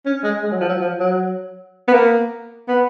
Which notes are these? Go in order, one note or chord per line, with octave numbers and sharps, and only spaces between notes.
C#4
G#3
G#3
F#3
F3
F#3
F3
F#3
B3
A#3
B3